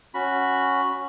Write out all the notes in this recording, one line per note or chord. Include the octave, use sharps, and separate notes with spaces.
C#4 F#4 B5